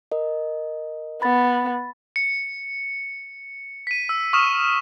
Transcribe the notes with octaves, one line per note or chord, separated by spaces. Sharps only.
A#4 D#5
B3 B5 A6
C#7
B6 D#7
E6
C#6 D#6 F6 E7